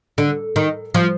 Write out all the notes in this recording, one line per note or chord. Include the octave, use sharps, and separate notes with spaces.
D3
D#3
F3